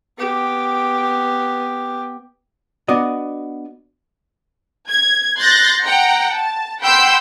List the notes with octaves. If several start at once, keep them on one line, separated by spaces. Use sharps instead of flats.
B3 G4
B3 D4 F#4 D5 D#5
G#6
C6 F#6 G6 A6 A#6
F#5 G5 A#5
A5
F#5 G5 B5 C6 E6 G6